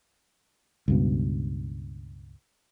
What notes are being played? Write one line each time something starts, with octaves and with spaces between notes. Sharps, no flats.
C#2 G2 B2